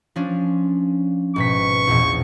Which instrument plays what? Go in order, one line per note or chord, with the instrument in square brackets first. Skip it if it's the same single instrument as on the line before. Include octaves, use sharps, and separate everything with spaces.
[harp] F3 C#4 D4
[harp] G#1 B2 B6 [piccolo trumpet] C#6
[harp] A#1 E2 B2